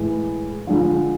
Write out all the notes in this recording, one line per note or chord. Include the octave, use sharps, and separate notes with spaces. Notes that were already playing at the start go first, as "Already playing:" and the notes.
Already playing: A2 E3 G#3
D3 F3 G#3